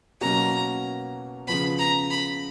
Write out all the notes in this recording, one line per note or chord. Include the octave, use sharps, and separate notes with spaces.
B2 F#3 A#3 C#4 F#4 A#5
C#3 F3 B3 B5
A#5
B5